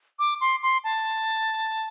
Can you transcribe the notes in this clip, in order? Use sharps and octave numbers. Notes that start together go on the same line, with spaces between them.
D6
C6
C6
A5